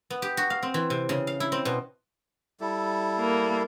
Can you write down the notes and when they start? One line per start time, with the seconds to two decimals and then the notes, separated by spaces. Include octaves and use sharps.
0.10 B3
0.22 G4
0.37 F#4
0.50 F5
0.63 C4
0.74 E3
0.90 C3
1.09 C#3
1.27 F5
1.40 E4
1.52 C4
1.65 B2
2.60 G3 E4 A4
3.18 A#3